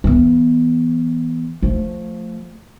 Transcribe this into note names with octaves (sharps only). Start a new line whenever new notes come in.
E3 B3
F3 A3